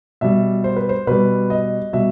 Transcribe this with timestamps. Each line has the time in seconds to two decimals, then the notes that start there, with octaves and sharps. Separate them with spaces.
0.21 B2 G3 E5
0.64 C5
0.76 B4
0.89 C5
1.07 B2 G3 B4
1.50 D#5
1.93 B2 G3 E5